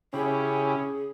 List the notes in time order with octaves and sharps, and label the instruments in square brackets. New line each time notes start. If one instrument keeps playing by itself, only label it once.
[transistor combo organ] C#3 E4 G4 [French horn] C#4 [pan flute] G#4